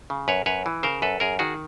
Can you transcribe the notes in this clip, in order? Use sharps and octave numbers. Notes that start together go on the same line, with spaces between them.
C#3
F#2 B4 C#5
F#2 B4 C#5
E3
C#3 A#4 C5
F#2 A4 B4
F#2 G#4 A#4
D#3 F#4 G#4